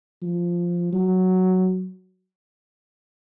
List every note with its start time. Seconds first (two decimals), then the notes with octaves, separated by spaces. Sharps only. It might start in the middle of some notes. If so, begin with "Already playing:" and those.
0.22 F3
0.93 F#3